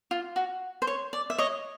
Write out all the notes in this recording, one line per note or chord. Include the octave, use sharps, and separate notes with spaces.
F4
F#4
C5
C#5
D5
E5
C#5 D#5